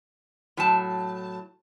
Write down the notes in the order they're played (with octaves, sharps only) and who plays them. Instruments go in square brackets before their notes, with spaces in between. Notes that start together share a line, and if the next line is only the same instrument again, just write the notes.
[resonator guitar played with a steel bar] A2 F#3 A5